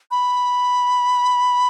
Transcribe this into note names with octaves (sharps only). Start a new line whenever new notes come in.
B5